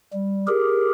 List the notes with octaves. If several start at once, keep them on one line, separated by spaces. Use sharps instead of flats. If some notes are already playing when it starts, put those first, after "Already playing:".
G3
G4 G#4 A#4